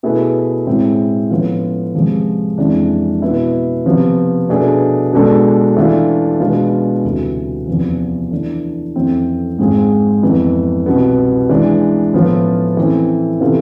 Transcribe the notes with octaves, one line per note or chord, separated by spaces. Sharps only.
B2 A3 E4 G#4 B4
A2 G#3 C4 E4
A2 F3 B3 F4
C3 F3 G#3
F2 E3 G#3 D4
B2 B3 E4
C3 F3 B3
B2 A3 D4 G#4 B4
B2 G#3 D4 A4
E3 A3 D4 F4
B2 G#3 B3 D4 F4
D2 C3 E3
E2 C3 F3
E3 A3 D4
F2 E3 A3 C4
G#2 G#3 C4 F4 G#4
F2 E3 B3
C2 B2 B3
E3 G#3 D4
A2 F3 B3 F4
E3 A3 C4
C3 E3 B3 F4 A4